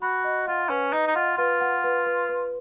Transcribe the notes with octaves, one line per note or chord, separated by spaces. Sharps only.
F#4 B5
D#5
F4 F#5
C#4 B4
D#4 D#5
D#4
F4 F#5
F4 B4
F#5
B4
B4
B4